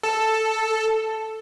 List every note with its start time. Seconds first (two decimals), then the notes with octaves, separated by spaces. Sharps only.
0.03 A4